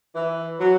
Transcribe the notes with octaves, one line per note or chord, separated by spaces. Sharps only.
E3
F#3